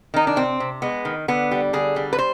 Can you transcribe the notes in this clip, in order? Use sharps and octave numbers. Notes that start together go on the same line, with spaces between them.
D#3 D#4
D4
C3 C4
C3
G#3 B3
D#3
D3 B3
G3
D3 G#4
G3
B4
C5